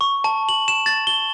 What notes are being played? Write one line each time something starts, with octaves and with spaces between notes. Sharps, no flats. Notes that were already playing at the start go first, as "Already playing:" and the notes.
C#6
A5
F#7
E7
A6
G7